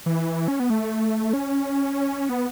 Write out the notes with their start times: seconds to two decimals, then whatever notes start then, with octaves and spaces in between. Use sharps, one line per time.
0.06 E3
0.48 C#4
0.60 B3
0.70 A3
1.33 C#4
2.29 B3